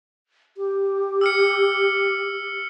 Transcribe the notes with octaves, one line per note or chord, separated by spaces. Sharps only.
G4
E6 F6 C#7